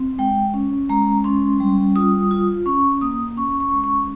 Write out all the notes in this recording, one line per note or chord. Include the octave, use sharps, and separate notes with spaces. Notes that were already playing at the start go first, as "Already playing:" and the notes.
Already playing: C4
G#3 G5
C#4
G#3 A#5
C#4 C6
G3
F4 D#6
F4
C#4 C#6
A#3 D#6
C#4 C#6
C#6
G#3
C#6